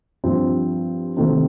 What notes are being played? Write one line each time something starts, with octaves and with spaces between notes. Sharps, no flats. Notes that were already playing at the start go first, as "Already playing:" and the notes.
G2 F3 C4
C3 D#3 A3 C4